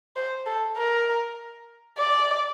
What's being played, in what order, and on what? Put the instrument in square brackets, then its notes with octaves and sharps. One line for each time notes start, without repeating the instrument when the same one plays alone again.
[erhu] C5
A4
A#4
D5